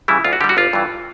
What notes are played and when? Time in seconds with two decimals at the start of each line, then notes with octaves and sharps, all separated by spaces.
0.08 C#3 E3 G3 E4
0.25 D2 F4
0.33 F#4
0.41 D3 G4
0.44 G3
0.49 F#4
0.57 G1 F4
0.73 G2 E3